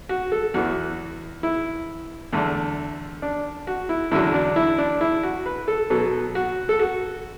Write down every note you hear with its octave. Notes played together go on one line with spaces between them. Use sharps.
F#4
A4
E2 E3 B3 F#4
E4
E2 D3 A3
D4
F#4
E4
E2 D3 F#3 E4
D4
E4
D4
E4
F#4
B4
A4
B2 F#3 B3 A4
F#4
A4
F#4